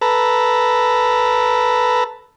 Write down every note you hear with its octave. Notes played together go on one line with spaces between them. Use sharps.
A4 B4 A#5